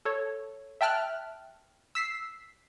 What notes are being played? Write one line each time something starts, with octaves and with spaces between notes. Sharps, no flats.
A4 C#5
E5 G5 A5 F6 F#6
E6 B6 C7